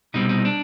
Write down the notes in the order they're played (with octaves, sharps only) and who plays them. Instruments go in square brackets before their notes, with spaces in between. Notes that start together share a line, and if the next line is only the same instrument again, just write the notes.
[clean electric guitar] C2 B2 G3 C4 D#4
D#4
D4